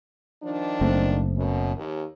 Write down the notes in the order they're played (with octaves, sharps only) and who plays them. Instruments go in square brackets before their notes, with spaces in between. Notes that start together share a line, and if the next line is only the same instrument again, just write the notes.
[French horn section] D#3 F3 D4
[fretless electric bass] F#1 A3 C4
[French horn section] F#2 B2
D#2